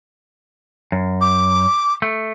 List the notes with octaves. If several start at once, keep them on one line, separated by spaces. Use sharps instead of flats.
F#2
D6
A3